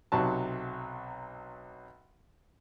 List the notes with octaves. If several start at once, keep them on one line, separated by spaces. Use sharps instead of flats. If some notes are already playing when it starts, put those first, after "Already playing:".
B1 C3 F#3 A5